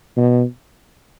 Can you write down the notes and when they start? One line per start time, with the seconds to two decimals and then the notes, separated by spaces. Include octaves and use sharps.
0.16 B2